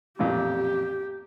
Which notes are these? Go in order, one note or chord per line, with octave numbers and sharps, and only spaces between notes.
A1 F2 A#2 G4